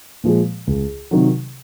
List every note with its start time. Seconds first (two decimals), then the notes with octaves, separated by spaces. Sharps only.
0.24 A#2 F3 G#3
0.67 C#2
1.11 C3 D#3 F#3